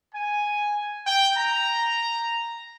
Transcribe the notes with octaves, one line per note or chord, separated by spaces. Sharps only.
G#5
G5
A#5